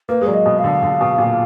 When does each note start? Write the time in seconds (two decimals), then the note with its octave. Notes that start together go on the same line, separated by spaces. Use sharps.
0.09 A#3 B4
0.21 G#3
0.27 F#3 D5
0.34 D#5
0.46 B2
0.58 F5
0.64 D3
0.83 D3
1.01 B2
1.18 A#2